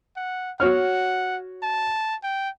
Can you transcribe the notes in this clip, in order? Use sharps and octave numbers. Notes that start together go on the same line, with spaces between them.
F#5
F#4 C#5 F#5 F6
A5
G5